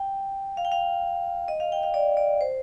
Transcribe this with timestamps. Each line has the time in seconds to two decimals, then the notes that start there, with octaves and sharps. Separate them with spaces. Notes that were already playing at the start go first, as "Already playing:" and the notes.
Already playing: G5
0.57 F5
0.65 G5
0.72 F5
1.48 D#5
1.60 F5
1.72 G5
1.83 F5
1.94 D5
2.17 D5
2.41 C5